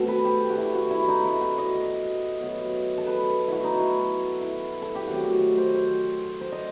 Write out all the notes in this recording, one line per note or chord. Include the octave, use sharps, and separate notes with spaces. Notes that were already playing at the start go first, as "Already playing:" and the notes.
Already playing: B2 A3 C4 A4
B4
G4
F#4
E4
F#4
E4
D#4
E4
F#4
D#5
B2 F#3 B3
A4
B4
A4
E4 F#4
D#4
E4
E4
A4
G4
D#3 F#3 A3 C4 F#4
F#4
C5
C5
C5
C5
D#5